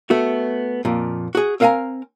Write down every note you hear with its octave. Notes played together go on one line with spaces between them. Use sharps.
A3 B3 F#4
F2 A#2
F#4 G#4
C4 A#4 F5 F#5 G#5 A#5